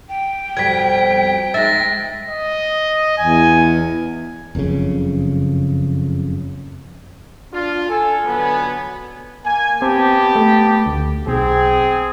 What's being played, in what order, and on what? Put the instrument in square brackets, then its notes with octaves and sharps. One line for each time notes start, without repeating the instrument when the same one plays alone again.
[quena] G5
[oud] F2 B2 G3 [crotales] G#6 B6
[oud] G#3 D#4 E5 [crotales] A6 A#6
[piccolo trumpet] D#5
[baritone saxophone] E2 [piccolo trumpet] G#5
[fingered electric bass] F#1 F2 A2 C#3
[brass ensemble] D4 F4
[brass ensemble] A4 [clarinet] G#5
[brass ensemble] D3 F#3 B3
[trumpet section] A#3 G#5
[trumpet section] B3 G4 A5 [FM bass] C4
[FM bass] A3
D2
[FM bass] B1 [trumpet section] C4 G#4